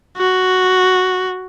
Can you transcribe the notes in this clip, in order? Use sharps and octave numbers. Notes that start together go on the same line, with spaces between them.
F#4